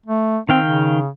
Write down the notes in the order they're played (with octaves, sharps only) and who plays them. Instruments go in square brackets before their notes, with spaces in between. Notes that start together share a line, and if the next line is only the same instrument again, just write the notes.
[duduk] A3
[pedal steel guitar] D#3 F5 G5 [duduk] C4
[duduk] C#3